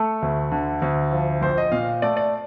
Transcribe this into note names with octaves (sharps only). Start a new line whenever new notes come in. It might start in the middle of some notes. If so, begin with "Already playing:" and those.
Already playing: A3 A4
D2
D3
D2
F3
A#1 C5
D#5
A#2 F5
A3 D5
D5